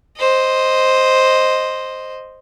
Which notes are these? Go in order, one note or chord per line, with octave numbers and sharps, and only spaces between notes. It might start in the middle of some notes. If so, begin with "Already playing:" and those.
C5 D#5